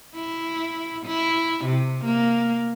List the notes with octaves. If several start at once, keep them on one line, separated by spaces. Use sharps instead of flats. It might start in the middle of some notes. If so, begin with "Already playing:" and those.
E4
E4
C3
A#3